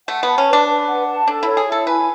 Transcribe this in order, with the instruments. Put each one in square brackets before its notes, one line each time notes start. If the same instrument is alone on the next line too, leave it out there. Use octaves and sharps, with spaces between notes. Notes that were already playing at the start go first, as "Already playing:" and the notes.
[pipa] A3 [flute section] F#5
[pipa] B3
[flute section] A5
[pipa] C#4
[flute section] B4
[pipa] D4
[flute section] B4
F#5
A5
[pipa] D4 [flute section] A4
[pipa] E4 [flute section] C#5
[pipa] G#4
[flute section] E4 [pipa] A4
[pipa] B4 [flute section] G#5